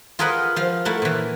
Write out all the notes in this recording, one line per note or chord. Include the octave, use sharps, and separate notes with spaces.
F4 G#4 A#4 B4 D#5 F#5
F3 F5
A3 E4 A#4 F#5
A#2 E3